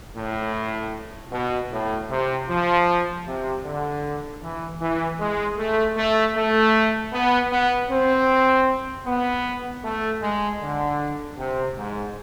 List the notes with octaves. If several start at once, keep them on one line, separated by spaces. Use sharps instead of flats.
A2
B2
A2
C3
F3
C3
D3
E3
E3
G#3
A3
A3
A3
B3
B3
C4
B3
A3
G#3
D3
C3
G#2